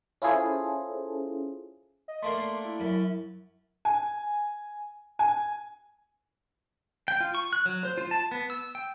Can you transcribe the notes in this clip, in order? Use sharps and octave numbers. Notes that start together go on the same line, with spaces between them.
C#4 E4 F4 G#4 A4 C5
D#5
A3 A#3 D4 C6
E4
F#2
G#5
G#5
G5
F4
C#6
F#6
F#3
C5
F4
A5
B3
E6
G5